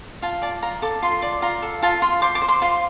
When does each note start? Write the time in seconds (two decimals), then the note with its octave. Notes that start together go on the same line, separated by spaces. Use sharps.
0.22 F4 A5
0.42 D5 A5
0.62 F4 A#5
0.82 A4 D6
1.02 F4 C6
1.22 D5
1.42 F4 A#5
1.62 A4
1.83 F4 A5
2.02 F4 C6
2.22 C5 D6
2.35 D6
2.42 C5
2.48 C6
2.62 F4 C6